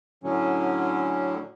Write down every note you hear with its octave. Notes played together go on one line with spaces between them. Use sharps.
A2 D3 F#3 C#4